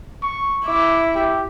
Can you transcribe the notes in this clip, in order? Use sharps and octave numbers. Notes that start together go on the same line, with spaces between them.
C#6
E4 D6
G4